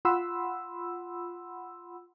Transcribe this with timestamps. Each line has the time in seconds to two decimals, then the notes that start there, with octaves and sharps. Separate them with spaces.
0.05 F4 F#5 B5 C6 E6